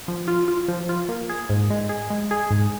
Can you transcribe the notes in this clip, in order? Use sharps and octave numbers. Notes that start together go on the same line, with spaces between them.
F3
F4
F4
F3
F4
A#3
G#4
G#2
G#3
G#4
G#3
G#4
G#2